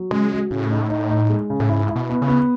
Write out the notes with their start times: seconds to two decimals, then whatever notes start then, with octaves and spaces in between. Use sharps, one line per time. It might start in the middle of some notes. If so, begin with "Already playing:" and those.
Already playing: F#3
0.11 C#3 G#3
0.31 F#4
0.51 A2 C#3
0.70 D#4
0.90 D#4
1.09 D#4
1.29 G#3
1.50 C#3
1.60 A2
1.69 G#2 E4
1.89 E4
1.96 B2
2.09 B3
2.22 C#3
2.28 B3